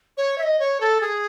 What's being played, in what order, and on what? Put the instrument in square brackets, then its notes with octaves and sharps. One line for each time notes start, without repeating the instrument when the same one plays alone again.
[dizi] C#5
E5
D#5
C#5
A4
G#4